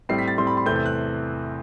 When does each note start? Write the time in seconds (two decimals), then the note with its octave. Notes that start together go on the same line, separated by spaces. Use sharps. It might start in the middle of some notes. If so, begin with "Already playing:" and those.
0.09 A2 G3 C4 C7
0.19 B6
0.28 A6
0.37 A2 G3 C4 C6
0.47 B5
0.57 C6
0.66 E2 C3 E3 A3 C4 G6
0.76 G6
0.86 F#6